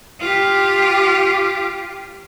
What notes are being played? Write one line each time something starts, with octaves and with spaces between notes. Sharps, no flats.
F4 G4